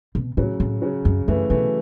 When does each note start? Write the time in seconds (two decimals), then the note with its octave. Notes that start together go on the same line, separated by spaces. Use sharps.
0.15 B2
0.37 A2 C#3 F#3
0.60 A2
0.82 C#3 F#3
1.05 F#2
1.28 F#2 E3 A3
1.50 B2 E3 A3